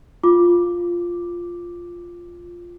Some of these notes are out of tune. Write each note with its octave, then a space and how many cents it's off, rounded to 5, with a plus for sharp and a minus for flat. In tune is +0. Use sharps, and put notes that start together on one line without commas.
F4 +0 D6 +0